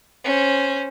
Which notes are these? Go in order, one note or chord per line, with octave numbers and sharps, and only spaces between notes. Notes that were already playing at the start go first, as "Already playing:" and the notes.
C#4 C5